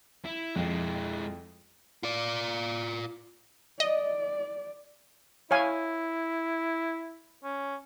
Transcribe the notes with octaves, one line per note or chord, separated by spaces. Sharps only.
E4
F2 G#3 E4
F4 D5
D5 D#5
E4 C#5 F5 G#5
C#4